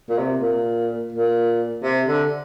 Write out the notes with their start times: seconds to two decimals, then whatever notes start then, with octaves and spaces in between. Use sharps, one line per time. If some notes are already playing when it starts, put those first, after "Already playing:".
0.09 A#2
0.18 C3
0.41 A#2
1.13 A#2
1.83 C3
2.07 D3